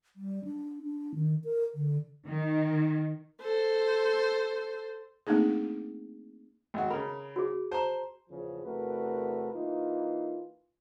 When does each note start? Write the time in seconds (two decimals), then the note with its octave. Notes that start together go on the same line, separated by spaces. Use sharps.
0.16 G3
0.45 D4
0.83 D4
1.15 D#3
1.44 A#4
1.74 D3
2.27 D#3
3.41 A4 C5
5.27 A3 A#3 C4 D4 D#4 G#4
6.74 G#1 F#4
6.90 C#3 A#4 B5
7.36 F#4 G#4
7.72 C5 A5 A#5
8.29 E2 A#2 C#3 F3
8.65 E2 C3 A3 F#4 A#4 B4
9.53 E3 A#3 D#4 F4